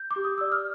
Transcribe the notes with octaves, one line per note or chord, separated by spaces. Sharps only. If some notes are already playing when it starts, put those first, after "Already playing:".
Already playing: G6
D6
G4
D#6
D5 E6
F6